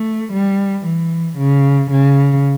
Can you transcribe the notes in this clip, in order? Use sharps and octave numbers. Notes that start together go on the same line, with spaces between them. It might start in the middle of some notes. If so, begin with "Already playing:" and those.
Already playing: A3
G3
E3
C#3
C#3